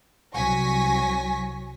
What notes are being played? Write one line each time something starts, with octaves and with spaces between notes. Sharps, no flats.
C2 F#3 G#5 C#6 A#6 B6